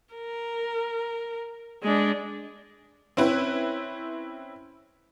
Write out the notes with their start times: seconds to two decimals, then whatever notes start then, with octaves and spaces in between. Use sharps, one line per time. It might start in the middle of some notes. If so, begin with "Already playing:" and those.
0.14 A#4
1.83 G#3 D4
3.17 C4 C#4 E4 B4